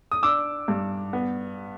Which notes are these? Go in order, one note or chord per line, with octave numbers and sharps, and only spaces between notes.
D#6
D4 D6 E6
G2
B3